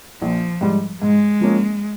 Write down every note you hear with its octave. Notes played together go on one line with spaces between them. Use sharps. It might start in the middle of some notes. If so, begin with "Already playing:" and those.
A#1 F3
G#2 G3
G#2 G#3
F3 A#3 C#4